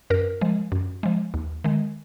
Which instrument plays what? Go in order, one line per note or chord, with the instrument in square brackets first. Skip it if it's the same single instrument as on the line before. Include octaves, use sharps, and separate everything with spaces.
[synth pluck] F#2 A#4
F3 G#3
F#2
F3 G#3
D#2
D#3 G#3